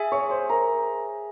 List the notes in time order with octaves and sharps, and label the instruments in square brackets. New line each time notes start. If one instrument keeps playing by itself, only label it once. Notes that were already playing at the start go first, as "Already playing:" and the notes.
Already playing: [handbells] G#4 E5 G#5
[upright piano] C#5 C#6
C5 C6
A#4 A#5